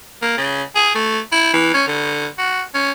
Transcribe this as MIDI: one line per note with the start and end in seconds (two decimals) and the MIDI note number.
0.22 0.36 58
0.37 0.62 49
0.75 0.91 68
0.95 1.19 57
1.32 1.53 64
1.53 1.72 52
1.74 1.86 61
1.87 2.28 50
2.38 2.62 66
2.74 2.91 61